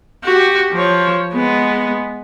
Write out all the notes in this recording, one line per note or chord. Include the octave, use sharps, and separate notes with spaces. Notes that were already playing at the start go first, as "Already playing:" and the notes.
F#4 G4
F3 C#5
G#3 B3